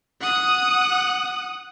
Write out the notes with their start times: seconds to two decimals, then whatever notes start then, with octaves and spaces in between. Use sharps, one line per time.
0.21 F#5 D#6